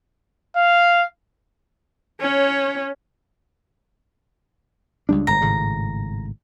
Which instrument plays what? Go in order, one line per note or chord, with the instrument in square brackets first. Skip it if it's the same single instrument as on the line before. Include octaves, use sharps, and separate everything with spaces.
[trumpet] F5
[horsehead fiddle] C#4 C#5
[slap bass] C#2 G3 D4
[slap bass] G1 G#2 [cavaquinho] A#5
[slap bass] G#1 A2 C#3